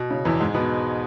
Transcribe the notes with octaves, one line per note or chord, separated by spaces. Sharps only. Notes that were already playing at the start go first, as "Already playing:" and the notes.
Already playing: B2
C#3
E2 E3
G#2 G#3
B2 B3